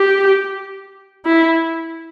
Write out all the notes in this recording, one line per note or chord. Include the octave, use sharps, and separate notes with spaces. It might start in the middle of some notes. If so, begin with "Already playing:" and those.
Already playing: G4
E4